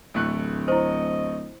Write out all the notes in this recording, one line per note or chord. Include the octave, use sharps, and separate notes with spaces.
D1 A1 A3 F#6
E4 C5 D#5